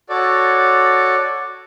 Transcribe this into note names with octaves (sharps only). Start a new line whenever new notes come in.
F#4 A4 C#5 D5